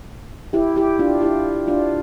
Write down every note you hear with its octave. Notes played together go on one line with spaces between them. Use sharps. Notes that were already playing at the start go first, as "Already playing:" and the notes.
E4 G4
E4 G4
D4 F4
E4 G4
D4 F4